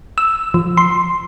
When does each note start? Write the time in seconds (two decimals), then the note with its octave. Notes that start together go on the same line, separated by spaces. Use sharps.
0.18 E6
0.54 F3
0.77 C6